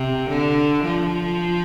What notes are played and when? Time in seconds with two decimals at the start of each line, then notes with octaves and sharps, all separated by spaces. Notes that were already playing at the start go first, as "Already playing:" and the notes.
Already playing: C3
0.29 D3
0.84 F3